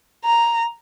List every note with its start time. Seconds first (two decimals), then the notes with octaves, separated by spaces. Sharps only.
0.24 A#5